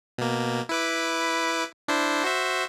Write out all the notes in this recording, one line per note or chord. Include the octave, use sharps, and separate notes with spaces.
B2 A#3
E4 B4 D6
D4 E4 C5
F#4 C5 E5